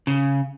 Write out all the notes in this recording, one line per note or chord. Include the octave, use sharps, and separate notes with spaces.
C#3